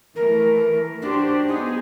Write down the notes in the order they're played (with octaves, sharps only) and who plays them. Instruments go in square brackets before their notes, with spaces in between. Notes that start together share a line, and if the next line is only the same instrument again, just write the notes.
[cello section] E3 A3 [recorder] A#4
[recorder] D4 [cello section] F#4 G4 C5
[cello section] B3 G#4 [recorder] D#4